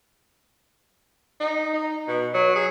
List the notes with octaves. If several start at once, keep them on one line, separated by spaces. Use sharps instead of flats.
D#4
D#4
B2
F#3
G#4